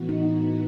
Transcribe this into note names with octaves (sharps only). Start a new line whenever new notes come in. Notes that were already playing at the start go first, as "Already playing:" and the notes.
Already playing: A2 E3 B3 F#4
D#4